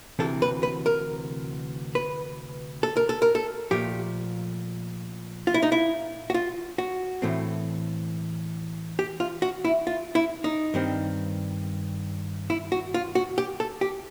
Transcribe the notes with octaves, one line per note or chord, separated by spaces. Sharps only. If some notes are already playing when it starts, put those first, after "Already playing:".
D2 C3 E3 A4
B4
B4
A#4
B4
A4
A#4
A4
A#4
A4
A#2 F3 A3 G4
F4
E4
D#4
E4
F#4
F4
F#4
A2 E3 A3 C4
G4
F4
F#4
E4
F4
E4
D#4
G2 D#3 G3 C4
E4
F#4
F4
F#4
G4
A4
G4